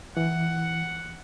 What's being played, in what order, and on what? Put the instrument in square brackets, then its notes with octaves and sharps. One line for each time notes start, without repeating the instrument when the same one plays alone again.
[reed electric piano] E3 [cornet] F#5